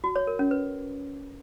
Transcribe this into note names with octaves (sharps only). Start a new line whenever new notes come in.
F#4
C#5
A#4
C#4
B4